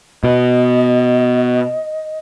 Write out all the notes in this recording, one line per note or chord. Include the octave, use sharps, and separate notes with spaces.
B2 D#5